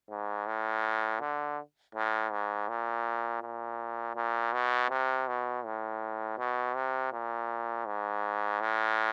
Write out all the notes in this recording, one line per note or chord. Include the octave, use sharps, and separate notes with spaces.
G#2
A2
D3
A2
G#2
A#2
A#2
A#2
B2
C3
B2
A2
B2
C3
A#2
G#2
A2